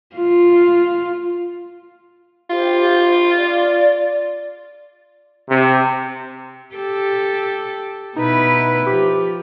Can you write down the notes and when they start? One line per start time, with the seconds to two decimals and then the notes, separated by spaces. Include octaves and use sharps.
0.16 F4
2.50 F4 G4 C5
3.38 D5
5.48 C3
6.75 G4 A4
8.16 B2 D#4 E4 B4
8.86 F3 G4